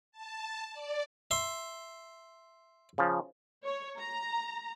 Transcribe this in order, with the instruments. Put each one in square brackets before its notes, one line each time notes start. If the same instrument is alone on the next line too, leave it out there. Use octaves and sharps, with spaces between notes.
[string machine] A5
D5
[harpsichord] E5 C6
[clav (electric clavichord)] C#3 F3
[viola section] C#5
A#5